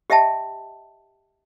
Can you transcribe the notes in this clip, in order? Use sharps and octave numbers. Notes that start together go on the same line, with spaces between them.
G4 D#5 E5 G5 A5